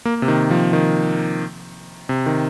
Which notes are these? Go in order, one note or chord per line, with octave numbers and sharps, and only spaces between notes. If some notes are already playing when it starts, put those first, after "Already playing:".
A#3
C3
D#3
F3
D#3
C3
D#3